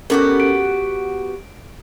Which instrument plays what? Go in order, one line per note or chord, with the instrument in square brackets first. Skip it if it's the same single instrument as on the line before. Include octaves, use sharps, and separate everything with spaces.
[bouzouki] B3 F#4 G4 [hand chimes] C#4 A4 A#4
[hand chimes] D7